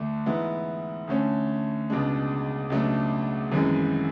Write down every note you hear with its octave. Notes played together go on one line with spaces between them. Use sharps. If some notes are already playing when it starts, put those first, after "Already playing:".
Already playing: D2 D3 A3 D4
G#2 E3 B3 E4
D2 D3 A3 C#4
C#2 B2 G#3 D4
C#2 B2 F#3 A3 D4
G#1 F#2 E3 G#3